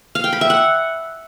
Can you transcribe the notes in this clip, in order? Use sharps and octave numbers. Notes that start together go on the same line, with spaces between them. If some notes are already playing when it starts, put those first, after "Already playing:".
F5
G5
B5
E5
F#5